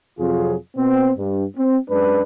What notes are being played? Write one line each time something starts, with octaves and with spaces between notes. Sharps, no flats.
F2 C3 F#3 F4 G#4
B2 B3 C4
G2
C4
F#2 G#3 D4 B4